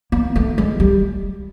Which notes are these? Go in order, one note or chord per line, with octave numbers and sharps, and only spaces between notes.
A#3
A3
G#3
G3